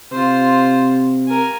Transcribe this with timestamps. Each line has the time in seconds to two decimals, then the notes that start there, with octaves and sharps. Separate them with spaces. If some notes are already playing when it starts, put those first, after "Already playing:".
0.12 C3 F4 C5
1.28 A#4 G#5